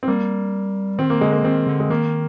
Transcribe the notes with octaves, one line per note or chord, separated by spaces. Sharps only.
C4
G3 A#3
D#3 C4
A#3
D3 G#3
A#3
D#3 C4
D3
G#3
D#3 A#3